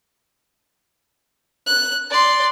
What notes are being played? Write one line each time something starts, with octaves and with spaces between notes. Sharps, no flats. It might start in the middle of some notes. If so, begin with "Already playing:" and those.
F#6
D5 C6